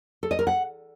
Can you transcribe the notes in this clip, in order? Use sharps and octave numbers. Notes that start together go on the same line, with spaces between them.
A4
D#5
A#4
F#5